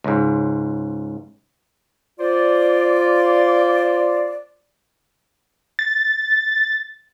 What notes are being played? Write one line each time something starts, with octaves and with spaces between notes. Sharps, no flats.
C#2 G#2
F4 C5 D5
A6